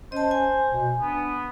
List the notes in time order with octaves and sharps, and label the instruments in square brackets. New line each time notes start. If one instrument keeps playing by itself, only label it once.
[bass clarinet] C#4 [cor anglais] C5 [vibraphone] D#5 A5
[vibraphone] G#5
[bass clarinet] B2
[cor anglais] B3 [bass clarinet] D4